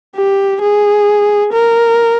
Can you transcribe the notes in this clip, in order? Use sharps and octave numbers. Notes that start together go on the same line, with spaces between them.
G4
G#4
A#4